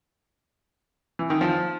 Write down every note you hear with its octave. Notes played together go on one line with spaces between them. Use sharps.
E3
D#3
F3